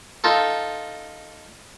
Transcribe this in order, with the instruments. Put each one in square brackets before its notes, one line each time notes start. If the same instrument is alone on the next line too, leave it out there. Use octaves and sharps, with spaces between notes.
[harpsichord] D#4 F4 A4